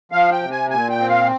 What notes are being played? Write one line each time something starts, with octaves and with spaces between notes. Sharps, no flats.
F3 F5
G5
C3
G#5
A#2 G#5
G5
C4
F5